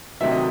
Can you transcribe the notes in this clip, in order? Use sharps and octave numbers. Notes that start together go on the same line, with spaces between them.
D2 C3 D#3 F#3 E5
D#5